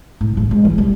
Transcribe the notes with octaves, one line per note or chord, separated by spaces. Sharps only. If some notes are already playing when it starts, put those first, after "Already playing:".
A2
A1
G#3
E3
G3